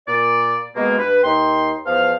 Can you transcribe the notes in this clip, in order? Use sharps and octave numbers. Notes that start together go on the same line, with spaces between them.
A#2 D5
B2 G#3 A#3
G2 B4
D#2 D#4 G5 C6
E2 F3 F5